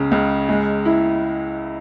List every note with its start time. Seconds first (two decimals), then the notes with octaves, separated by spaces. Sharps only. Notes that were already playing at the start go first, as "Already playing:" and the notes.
Already playing: C#2 C#3
0.11 C#2
0.49 G#3
0.85 E4